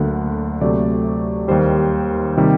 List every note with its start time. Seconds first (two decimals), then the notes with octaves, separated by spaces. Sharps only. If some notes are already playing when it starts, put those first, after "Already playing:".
Already playing: D2 D3 F#3 A#3 F#5
0.61 D2 C3 F#3 A3 D5
1.48 D#2 D#3 G3 C5
2.37 C3 D#3 G3